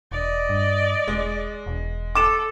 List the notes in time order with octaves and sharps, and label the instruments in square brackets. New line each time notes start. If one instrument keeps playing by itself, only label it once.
[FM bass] E1 [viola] D5 D#5
[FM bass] G2
[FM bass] E1 [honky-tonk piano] G#3
[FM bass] E1
[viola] A4 [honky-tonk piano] D6 E7